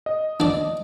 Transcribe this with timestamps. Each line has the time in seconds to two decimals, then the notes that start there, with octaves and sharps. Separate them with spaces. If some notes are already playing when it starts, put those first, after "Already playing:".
0.06 D#5
0.40 D4 D5